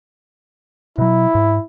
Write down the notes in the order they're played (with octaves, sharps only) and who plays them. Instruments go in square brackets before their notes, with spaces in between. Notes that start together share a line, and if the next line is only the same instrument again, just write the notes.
[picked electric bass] B2 F#3 [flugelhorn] E4
[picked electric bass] G#2